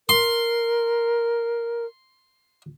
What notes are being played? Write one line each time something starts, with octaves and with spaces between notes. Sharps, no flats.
A#4 C6